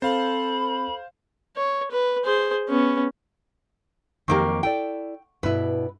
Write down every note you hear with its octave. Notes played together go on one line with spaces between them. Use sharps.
C4 A4 C5 F5 B5
C#5
B4
G#4 C5
B3 C#4
F2 D#3 F#3 A#3 G4 A#4
E4 A4 D5 G5
G2 B2 E4 B4